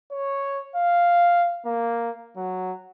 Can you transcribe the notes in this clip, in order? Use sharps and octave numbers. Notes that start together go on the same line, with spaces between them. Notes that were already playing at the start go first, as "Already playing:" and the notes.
C#5
F5
A#3
F#3